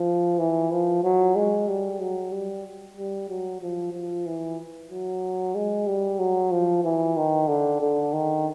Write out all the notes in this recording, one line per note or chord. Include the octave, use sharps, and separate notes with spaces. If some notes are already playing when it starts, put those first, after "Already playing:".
Already playing: F3
E3
F3
F#3
G#3
G3
F#3
G3
G3
F#3
F3
F3
E3
F#3
G#3
G3
F#3
F3
E3
D#3
D3
D3
D#3